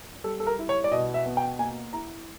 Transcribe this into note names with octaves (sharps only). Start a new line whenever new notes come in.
G3 A4
A4
A#4
E4
C#5
D5
B2 D#5
E5
B3
G5
A#3 G#5
E4 A#5